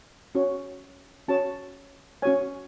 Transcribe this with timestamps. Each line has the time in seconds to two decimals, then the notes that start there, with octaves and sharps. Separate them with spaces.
0.35 C#4 F#4 C#5
1.28 C#4 F#4 C#5 A5
2.22 C#4 F#4 C#5 G#5